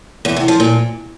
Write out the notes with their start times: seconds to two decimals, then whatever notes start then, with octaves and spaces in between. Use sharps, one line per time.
0.25 E2
0.36 C3
0.48 F3
0.60 A#2